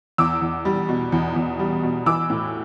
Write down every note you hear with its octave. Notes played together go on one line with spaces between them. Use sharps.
E2 D6 E6
E2
G3
B2
E2
E2
G3
B2
E3 D6 E6
A2